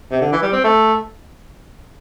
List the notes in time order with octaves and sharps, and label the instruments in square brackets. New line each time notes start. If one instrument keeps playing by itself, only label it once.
[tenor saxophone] C3
D3
E3
G3
C4
A3